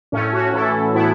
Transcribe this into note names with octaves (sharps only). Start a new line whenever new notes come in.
A2 A3 C#4
C#4 F#4
E3 E4 A4
A2 B3 E4